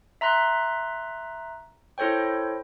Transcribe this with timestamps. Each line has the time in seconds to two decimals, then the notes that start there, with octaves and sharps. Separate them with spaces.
0.21 E5 A#5 C6 F#6
1.98 E4 A4 C5 C#5 G5